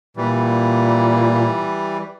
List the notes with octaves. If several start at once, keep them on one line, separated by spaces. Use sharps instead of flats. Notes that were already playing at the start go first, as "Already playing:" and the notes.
A#2 E3 G3